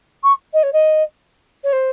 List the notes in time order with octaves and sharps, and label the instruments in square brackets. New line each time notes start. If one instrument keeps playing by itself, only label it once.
[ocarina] C#6
D#5
C#5
D#5
C#5
C5